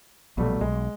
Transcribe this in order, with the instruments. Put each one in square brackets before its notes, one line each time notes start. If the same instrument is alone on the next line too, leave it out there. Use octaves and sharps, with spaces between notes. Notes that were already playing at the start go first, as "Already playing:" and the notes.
[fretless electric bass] A#1 B2 [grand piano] F#3 G3 A3
[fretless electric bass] B1 [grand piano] G#3